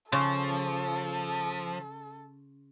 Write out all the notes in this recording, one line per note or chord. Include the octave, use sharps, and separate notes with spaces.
C#3 F3 A4 C6 C#6